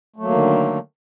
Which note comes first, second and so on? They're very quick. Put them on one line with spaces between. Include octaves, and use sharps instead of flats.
A3 F#3 A#3 D#3 D3